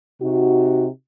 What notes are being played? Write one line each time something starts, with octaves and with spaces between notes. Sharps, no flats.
C3 D#4 F#4